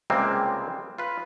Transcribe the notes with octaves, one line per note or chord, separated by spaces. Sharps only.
C#2 C3 G3 G#3 A#3 C4
F4 B4